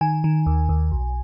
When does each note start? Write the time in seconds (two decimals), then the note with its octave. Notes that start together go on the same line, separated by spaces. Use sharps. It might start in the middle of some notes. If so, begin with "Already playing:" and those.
0.01 D#3 G#5
0.24 D#3
0.46 D#2
0.69 D#2
0.91 B1